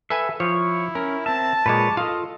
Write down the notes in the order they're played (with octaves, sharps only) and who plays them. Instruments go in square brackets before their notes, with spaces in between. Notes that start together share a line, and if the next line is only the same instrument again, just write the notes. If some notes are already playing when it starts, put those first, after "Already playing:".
[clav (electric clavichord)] A4 B4 G#5 [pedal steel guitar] E5
[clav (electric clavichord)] F3 [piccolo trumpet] E4 [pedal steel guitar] C#5
[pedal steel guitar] C#4 [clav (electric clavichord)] A#4
[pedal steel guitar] C4 E5 [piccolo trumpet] A5
[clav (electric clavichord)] A#2 G#3 [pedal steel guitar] B4 C#5 D6
[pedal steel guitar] F4 A4 [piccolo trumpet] D#5 [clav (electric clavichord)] F5